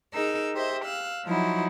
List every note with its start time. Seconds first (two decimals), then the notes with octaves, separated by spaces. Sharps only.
0.13 D#4 G#4 A#4 E6
0.54 G4 C5 D#5 E5
0.85 F5 E6 F#6
1.25 F3 F#3 D#4 E4 F#4